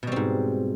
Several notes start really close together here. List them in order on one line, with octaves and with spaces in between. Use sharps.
B2 G3 C4 G#2